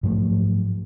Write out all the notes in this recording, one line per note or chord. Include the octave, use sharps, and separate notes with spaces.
G#2 F3 F#3 A3